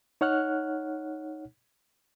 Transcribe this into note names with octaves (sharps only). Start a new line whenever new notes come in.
D#4 C#5 F#5 F6 F#6